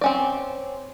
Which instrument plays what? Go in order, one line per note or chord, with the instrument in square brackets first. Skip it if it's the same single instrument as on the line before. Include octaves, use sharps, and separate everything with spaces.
[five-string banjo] C4 C#4 D5